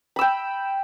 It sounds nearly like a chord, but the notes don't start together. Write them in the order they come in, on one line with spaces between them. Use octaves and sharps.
B5 E6 G5